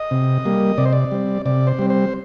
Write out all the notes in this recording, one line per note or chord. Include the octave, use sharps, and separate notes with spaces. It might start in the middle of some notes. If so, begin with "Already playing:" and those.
Already playing: D#5
C3
G3 A#3
C3 D5
C5
D5
G3 C4
C3 D5
C5
G3 C4
C5